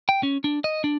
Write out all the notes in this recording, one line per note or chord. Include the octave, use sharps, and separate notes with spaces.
G5
C#4
D4
D#5
D4